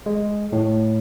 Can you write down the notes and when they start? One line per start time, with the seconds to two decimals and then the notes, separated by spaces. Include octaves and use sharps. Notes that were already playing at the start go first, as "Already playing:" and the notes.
0.06 G#3
0.52 A2